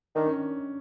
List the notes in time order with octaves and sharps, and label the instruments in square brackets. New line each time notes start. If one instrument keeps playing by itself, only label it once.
[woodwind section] D#3 [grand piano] D4
[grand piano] C#4